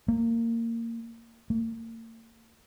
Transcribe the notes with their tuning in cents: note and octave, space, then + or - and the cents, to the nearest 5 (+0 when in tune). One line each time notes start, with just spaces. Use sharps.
A#3 -20
A#3 -45